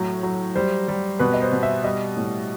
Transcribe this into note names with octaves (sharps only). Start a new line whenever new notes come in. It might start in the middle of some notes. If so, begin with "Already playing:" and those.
Already playing: A2 F#3
F#3
G3 C5
G3
B2 B4
D#5
C5
B2
E5
G3 D#5
A2